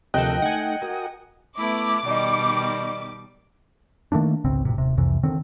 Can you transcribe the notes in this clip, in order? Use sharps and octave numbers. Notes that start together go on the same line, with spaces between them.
D2 C3 F3 A4 A#4 D#5 G5 F#6
A3 D#4 F#5 G#5
F#4 A#4 D#6
A3 B3 E4 D6
B2 D#3 G3 D5 D#5
D#3 A3 A#3 D4
G#1 C#2 C#3 C4
F1 B1 A2 C3
D#1 C3
C2 F2 C3 E3
D3 D#3 C4